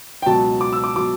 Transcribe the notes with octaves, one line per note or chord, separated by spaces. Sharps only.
G5
C#2 B2 F#3 A5
D6
E6
D6
B2 F#3 D6